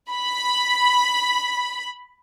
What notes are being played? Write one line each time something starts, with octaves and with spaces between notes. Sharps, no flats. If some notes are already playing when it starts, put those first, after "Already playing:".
B5